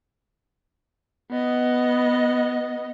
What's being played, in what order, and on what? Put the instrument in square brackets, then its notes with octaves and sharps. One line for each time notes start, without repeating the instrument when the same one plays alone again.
[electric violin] B3 D#5